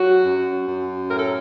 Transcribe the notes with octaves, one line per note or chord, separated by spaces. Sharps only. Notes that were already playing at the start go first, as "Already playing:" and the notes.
Already playing: F#3 F#4
F#2
F#2
A2 A#4
A4